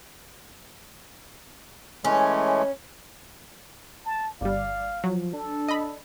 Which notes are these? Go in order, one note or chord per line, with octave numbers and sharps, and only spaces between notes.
E3 G#3 A3 C#4
A5
G1 G3 D5 F5
F3 F#3
D4 A4
D#5 B5